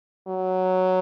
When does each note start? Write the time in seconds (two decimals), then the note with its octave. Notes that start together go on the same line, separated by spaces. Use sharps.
0.28 F#3